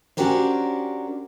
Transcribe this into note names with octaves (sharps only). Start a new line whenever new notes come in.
C#4 D4 F#4 G4 A#4 C5